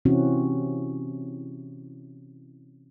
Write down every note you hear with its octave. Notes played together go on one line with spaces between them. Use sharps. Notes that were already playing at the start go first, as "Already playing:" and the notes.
C3 E3 C4 C#4 E4 F#4